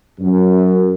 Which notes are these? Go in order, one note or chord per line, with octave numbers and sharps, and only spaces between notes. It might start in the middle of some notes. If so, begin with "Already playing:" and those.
F#2